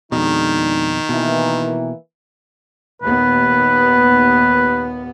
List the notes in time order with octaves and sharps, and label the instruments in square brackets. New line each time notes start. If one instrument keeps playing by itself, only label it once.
[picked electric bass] F2 B2 [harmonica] D#3 [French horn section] G#3 D4 D#4
[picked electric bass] B2 [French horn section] E3 A#3
[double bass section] D#2 A#2 B3 [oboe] B4